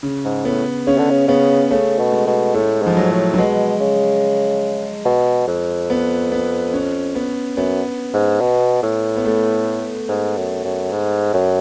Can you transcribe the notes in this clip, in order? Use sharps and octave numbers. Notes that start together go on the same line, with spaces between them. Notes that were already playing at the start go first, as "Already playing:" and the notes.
C#3
G#2
A2 B3
C#3 C#4
D3
C#3
C#3 B3
C#3 A3
B2
G#3
B2
A2 A3
G#2 F3
F#3
A2
F#3
B2 G#3
C#3
B2
F2
B3
B3
C#4
B3
F#2 B3
G#2
B2
A2
B3
A3
G#2
F#2
F#2
G#2
F#2